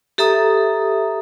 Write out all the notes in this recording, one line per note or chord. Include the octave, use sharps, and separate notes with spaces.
G4 A4 E5 A#5 D#6